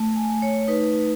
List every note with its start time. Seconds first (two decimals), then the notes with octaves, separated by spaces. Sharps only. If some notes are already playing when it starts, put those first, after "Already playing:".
Already playing: A3
0.16 G#5
0.30 A3
0.42 C#5
0.68 D#4 B4